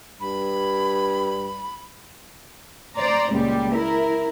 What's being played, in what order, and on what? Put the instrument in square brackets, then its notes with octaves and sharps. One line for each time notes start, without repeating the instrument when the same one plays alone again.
[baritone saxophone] G2 [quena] B5
[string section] C5 D5 A#5
C#2 A#2 G3
E4 A#4